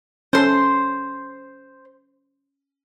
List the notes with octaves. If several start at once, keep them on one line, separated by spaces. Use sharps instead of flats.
C#4 A4 C5 C6